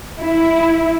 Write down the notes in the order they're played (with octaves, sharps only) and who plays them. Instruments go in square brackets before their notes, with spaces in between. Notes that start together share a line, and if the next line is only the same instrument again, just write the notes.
[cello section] E4